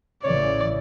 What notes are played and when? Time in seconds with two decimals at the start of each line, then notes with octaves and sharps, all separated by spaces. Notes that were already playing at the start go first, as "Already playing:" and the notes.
0.24 A1 C#3 E3 C#5 D5